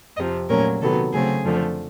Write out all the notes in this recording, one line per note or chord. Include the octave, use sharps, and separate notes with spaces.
F2 C3 F3 D#5
A#2 F#3 A3 C#4 A#4
C3 D#3 F#3 B3 A4
C#3 F#3 A3 C4 G#4
F2 D3 F3 A3